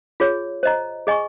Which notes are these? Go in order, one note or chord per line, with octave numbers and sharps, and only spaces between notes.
F4 G#4 C#5
C5 D#5 A#5
G#4 D#5 G#5 C#6